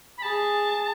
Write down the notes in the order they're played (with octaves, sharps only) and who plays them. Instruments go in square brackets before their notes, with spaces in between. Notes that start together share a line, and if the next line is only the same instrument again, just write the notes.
[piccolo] B5
[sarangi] G#4 [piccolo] A5